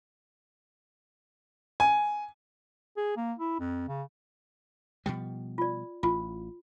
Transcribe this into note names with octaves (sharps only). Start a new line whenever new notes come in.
G#5
G#4
A#3
E4
F2
C#3
B2 F3 G3 G5
F4 D5
A1 F4